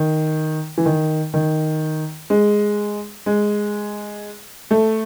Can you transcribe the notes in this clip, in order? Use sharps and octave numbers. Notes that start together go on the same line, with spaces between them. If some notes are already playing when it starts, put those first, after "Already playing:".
Already playing: D#3
E3
D#3
D#3
G#3
G#3
A3